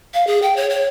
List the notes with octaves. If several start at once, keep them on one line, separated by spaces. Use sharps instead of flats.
F5
G#4
G5
C#5
C#5